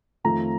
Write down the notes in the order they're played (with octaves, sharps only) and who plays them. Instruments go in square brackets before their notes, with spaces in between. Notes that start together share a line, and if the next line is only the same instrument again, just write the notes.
[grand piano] F2 D#3 A3 C4 F4 A#5